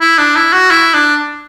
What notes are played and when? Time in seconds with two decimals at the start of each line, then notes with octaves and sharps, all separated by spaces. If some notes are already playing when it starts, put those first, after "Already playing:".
0.01 E4
0.18 D4
0.36 E4
0.53 F#4
0.71 E4
0.94 D4